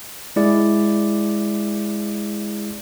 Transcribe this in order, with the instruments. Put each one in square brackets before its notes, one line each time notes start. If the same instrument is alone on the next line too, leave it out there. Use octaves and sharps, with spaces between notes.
[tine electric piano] G#3 E4 G#4 D5